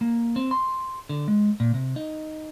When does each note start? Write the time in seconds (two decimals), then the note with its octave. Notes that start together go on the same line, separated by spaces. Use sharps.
0.01 A#3
0.36 C4
0.51 C6
1.09 D3
1.28 G#3
1.60 A#2
1.74 C3
1.96 D#4